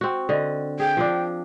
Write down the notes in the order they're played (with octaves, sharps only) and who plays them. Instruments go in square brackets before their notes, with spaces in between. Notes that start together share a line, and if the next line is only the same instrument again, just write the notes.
[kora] C4 F#4
D3 D#5
[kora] G#4 [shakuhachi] G5
[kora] F3 C4 D4